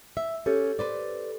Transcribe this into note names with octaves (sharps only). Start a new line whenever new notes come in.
E5
C#4 G4 A4
B4 C5 D5